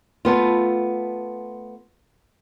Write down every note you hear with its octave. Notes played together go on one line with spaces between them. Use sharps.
A3 B3 F4